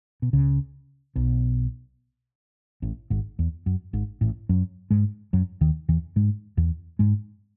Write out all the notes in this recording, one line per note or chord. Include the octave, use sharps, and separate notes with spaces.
B2
C#2 C#3
B1 B2
A1 A2
G#1 G#2
E2
F#2
G#1 G#2
A1 A2
F#2 F#3
G#2 G#3
F#2 F#3
D#2 D#3
E2 E3
G#2 G#3
E2 E3
G#2 G#3